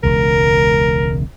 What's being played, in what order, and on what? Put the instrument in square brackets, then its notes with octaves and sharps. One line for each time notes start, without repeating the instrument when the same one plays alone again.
[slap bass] E1 C#2 C#3 [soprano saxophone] A#4